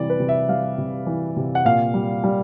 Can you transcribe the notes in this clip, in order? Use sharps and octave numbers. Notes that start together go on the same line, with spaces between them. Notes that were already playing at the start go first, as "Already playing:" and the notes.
Already playing: C3 E3 G3 D5
B4
C3
E5
G3 F5
C3
E3
C3
F#5
A#2 F5
G3
G3